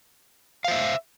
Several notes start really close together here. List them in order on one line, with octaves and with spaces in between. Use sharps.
F5 C5 E5